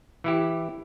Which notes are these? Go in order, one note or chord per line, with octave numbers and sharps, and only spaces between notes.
E3 E4 G4